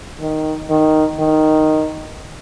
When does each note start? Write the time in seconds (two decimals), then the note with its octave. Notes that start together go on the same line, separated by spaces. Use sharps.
0.20 D#3
0.70 D#3
1.19 D#3